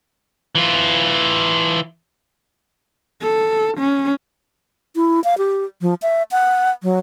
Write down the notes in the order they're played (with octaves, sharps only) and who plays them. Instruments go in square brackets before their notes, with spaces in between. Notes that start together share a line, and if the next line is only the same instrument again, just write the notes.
[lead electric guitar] E3 F4
[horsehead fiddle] A4
C#4
[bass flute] E4
F5
G4
F3
E5
F#5
F#3